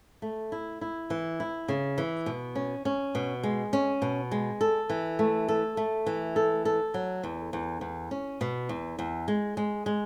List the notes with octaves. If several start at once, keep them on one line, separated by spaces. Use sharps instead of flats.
A3
E4
E4
E3
E4
C#3
E3
B2
C#4
C#4
B2
G#3
C#4
B2
G#3
A4
E3
A3
A4
A3
E3
A4
A4
F#3
E2
E2
E2
C#4
B2
E2
E2
G#3
G#3
G#3